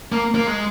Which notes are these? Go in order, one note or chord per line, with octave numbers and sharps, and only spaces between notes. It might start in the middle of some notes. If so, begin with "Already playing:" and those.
A#3
A#3
G#3